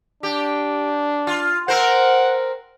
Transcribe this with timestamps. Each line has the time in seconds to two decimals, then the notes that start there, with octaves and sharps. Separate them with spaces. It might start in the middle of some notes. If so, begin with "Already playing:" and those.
0.23 D4 G4
1.27 F4
1.68 C4 A#4 C5 F#5